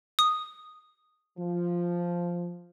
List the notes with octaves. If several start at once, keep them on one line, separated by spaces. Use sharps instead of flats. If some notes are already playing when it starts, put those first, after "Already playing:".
D#6
F3